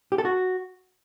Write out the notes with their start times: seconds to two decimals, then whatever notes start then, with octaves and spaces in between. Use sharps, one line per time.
0.12 G4
0.18 A4
0.25 F#4